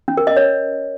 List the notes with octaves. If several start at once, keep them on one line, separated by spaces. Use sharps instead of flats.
C#4
A#4
D#5
C#5